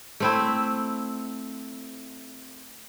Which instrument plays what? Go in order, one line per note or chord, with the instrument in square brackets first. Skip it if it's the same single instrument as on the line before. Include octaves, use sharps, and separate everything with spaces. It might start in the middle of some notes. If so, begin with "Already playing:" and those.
[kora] A3 C4 E4